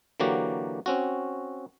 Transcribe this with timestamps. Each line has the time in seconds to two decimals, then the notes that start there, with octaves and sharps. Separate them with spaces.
0.20 D3 E3 F#3 A#3 F#4 G4
0.86 C4 C#4 F#4